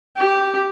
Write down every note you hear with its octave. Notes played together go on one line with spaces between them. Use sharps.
G4